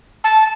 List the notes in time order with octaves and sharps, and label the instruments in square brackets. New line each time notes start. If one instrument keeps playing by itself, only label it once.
[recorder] A5